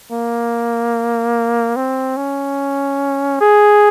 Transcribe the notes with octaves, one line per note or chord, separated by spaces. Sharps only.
A#3
C4
C#4
G#4